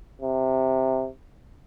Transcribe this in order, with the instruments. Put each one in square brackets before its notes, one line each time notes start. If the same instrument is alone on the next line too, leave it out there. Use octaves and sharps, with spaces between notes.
[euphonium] C3